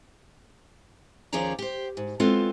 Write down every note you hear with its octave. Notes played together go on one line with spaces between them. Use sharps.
D#2 F3 C#4 G#4 D5 A#5
G4 C5
G#2
G#3 B3 C4 F4 A4